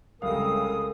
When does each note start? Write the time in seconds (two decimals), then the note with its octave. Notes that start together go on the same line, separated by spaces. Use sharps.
0.22 C2 C#3 G#3 A4 A#4 F5 D#6